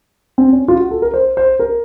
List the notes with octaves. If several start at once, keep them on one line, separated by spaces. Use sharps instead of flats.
C4
C#4
F4
F#4
A4
A#4
C5
C5
A#4